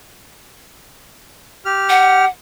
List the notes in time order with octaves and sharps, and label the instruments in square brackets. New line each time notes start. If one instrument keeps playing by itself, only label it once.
[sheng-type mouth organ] G4 F6
[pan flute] F#5